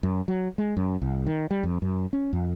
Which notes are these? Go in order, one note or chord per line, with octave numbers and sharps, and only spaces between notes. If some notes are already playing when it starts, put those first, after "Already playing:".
F#2
F#3
G#3
F#2
C2
D#3
G3
F2
F#2
C#4
F2